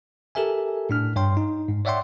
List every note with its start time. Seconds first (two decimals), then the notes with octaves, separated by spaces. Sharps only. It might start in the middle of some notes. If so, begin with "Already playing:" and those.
0.35 G4 A4 A#4 E5 G#5
0.90 A2 D4 F6
1.16 G2 C#5 G5 C6
1.37 D#4
1.68 G#2
1.85 C#5 D5 E5 F#5 G5 C6